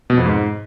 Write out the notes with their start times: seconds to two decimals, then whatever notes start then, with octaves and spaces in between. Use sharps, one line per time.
0.10 B2
0.18 F2
0.25 G#2